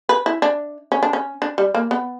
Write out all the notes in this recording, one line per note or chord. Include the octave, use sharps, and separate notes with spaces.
B4
E4
D4
C#4
D4
C#4
D4
G3
A#3
B3